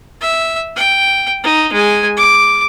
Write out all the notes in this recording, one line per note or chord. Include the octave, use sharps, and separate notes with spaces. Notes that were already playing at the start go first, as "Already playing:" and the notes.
E5
G5
D#4
G#3 G#5
D6